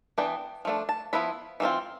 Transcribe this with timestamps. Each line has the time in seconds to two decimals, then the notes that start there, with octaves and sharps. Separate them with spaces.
0.18 E3 B3 D4 G5
0.65 F3 A3 D4
0.89 A5
1.13 F3 B3 E4 B5
1.60 E3 G3 C4 F4